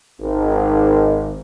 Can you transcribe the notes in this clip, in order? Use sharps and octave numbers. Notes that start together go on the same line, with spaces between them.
G#1